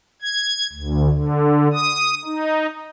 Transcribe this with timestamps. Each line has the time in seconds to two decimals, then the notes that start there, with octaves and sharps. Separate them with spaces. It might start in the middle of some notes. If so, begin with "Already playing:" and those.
0.22 G#6
0.72 D2
1.10 D3
1.73 D#6
2.25 D#4